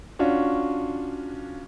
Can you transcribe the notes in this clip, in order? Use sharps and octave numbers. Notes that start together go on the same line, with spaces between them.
C#4 D4 F4 F#4